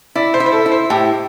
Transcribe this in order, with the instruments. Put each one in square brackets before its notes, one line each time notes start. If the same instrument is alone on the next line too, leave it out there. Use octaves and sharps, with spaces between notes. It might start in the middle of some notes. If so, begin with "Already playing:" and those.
[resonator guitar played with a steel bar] E4 [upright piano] D5
[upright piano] C5
[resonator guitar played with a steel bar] E4
[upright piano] C5
A4
[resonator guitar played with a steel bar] E4
[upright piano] C5
[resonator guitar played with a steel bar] A2 [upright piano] G4